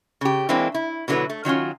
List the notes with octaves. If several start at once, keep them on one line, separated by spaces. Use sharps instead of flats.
C#3 G4
E3 G#3 A#3 C4 D4 E4
E4
B2 D3 F#3 A#3 E4 B4
A3
D#3 F#3 C#4 F4